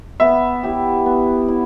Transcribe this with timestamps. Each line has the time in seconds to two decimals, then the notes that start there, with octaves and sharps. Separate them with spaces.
0.20 B3 E5
0.63 E4 G4
1.06 B3
1.48 E4